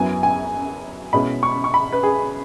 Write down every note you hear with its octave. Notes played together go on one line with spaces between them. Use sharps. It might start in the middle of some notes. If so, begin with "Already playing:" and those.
Already playing: F#2 F#3 B3 E4 G#5
G#5
B2 G#3 C#4 E4 B5
C#6
C#6
B5
B4
G#4